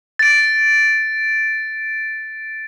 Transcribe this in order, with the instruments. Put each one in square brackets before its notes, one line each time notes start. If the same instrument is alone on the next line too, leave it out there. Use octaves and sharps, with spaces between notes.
[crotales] A6 D7